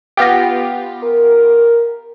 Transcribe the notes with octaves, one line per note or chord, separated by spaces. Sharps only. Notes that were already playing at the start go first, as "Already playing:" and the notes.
B3 F4 G4 G5 A#6
A#4